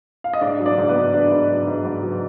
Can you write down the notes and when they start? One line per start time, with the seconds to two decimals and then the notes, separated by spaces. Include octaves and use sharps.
0.24 F5
0.33 D#5
0.41 G#2 D4 D5
0.60 F#3
0.66 D4 D5
0.78 G#2
0.89 B3 B4
0.95 G#2
1.14 G#2 D4
1.31 G#2
1.49 F#3
1.67 G#2
1.85 G#2
2.03 F#3